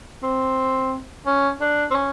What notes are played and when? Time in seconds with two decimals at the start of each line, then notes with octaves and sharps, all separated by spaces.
0.23 C4
1.26 C#4
1.61 D4
1.91 C4
1.94 C#4